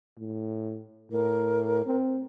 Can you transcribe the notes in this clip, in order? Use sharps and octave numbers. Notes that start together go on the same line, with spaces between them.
A2
A2 A#4
C4